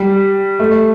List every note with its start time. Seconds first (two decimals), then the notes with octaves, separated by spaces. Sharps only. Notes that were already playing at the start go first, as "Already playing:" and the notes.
Already playing: G3
0.60 A3